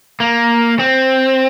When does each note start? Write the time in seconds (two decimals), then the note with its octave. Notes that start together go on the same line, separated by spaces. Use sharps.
0.20 A#3
0.79 C4